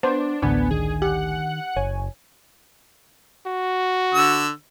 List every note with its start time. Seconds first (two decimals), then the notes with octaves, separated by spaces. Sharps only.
0.03 B3 D4 C5
0.42 A1 D2 B3 D4 G#5
0.71 D#3 G#4
1.02 G4 F#5
1.76 F#1 C#5 G#5
3.47 F#4
4.14 D3 E6